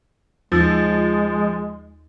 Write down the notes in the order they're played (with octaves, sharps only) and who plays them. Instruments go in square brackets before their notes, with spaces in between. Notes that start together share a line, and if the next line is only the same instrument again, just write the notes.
[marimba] D#2 E6 A6 [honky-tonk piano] F3 [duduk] G#3